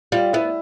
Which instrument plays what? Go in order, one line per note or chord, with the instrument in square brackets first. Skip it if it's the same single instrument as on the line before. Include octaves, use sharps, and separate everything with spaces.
[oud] G3 [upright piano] F4
[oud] B3 [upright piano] E4